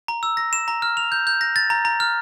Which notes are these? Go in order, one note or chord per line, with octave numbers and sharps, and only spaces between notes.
A#5
E6
A#6
E7
A#5
F6
F7
G6
G6
A#6
A6
A#5
A#5
F6